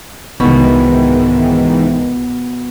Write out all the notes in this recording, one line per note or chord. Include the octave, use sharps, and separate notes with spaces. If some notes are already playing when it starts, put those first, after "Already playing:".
C2 G#2 B2 D#3 E3